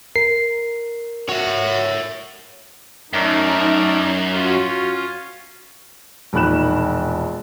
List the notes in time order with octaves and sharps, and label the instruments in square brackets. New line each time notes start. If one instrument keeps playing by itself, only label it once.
[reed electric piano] A#4 [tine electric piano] C7
[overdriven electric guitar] F#4 [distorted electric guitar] C#5 E5
[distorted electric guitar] F#2 [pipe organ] A3 A#4 D5 [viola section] D#4
[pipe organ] C#4 F4 [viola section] F#4
[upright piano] E1 A#1 D#3 B5 F#6 E7